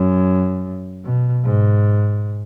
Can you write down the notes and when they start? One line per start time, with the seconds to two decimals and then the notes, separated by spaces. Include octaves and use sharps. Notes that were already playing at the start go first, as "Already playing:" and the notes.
Already playing: F#2
1.04 B2
1.44 G#2